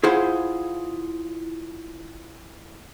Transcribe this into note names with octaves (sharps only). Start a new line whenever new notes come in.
E4 F4 G#4 C5 F5 F#5